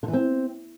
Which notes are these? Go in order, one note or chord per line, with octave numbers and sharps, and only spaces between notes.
D3
E3
C4